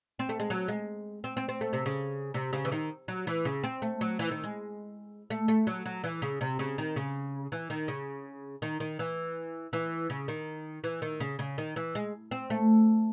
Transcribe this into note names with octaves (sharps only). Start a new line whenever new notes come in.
C4
A3
G#3
F#3
G#3
C4
C4
C4
A3
C3
C#3
C3
C#3
E3
D#3
F#3
E3
C#3
C4
A3
F#3
E3
D#3
G#3
A3
A3
F#3
F#3
E3
C#3
C3
C#3
D#3
C#3
E3
D#3
C#3
D#3
D#3
E3
E3
C#3
D#3
E3
D#3
C#3
C#3
D#3
E3
G#3
C4
A3